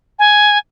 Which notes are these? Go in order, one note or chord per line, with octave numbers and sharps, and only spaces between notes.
G#5